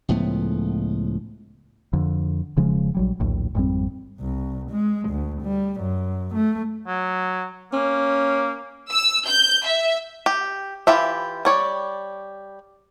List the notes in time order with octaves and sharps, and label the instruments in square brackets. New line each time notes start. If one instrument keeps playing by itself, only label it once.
[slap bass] C#2 A2 F3 B3
[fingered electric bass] F2 D3
E1 C#3 F3 G#3
A#1 F#3 G3
A#1 D#2 A2
G#1 F2 G3 C4
[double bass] C2
G#3
D2
G3
F#2
A3
[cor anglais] F#3
[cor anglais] A#3 [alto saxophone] C#4
[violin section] E6
G6
E5
[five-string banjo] G4
E3 E4 F4 G4 E5
G3 C#5 D5